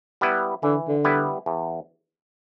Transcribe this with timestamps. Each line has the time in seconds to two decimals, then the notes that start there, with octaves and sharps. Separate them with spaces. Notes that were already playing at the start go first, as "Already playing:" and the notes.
0.21 G3 B3 E4 B4
0.63 D3 E3
0.88 D3
1.04 G3 B3 E4 B4
1.46 E2